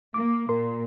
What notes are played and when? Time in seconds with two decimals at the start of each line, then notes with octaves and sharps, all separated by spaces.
0.14 A#3 D6
0.49 A#2 A#4 C6